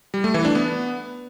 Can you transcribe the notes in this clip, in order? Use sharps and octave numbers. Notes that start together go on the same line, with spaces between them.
G3
A3
E3
D4
B3